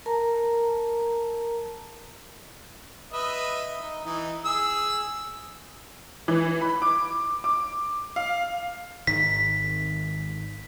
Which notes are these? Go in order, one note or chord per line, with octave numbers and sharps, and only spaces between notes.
A#4 A5 A#5
B4 D#5 E5
D#4
E3 D#4
G#4 E6
E3
B5
D6
D6
F5
G#1 D#3 B6